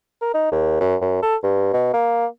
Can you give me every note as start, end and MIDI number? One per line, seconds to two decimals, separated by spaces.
0.21 0.32 70
0.34 0.47 63
0.52 0.78 39
0.80 0.96 42
1.01 1.17 42
1.22 1.35 69
1.43 1.69 43
1.73 1.89 47
1.93 2.26 58